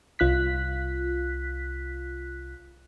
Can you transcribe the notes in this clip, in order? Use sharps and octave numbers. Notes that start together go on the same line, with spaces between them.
C2 F4 F#6 B6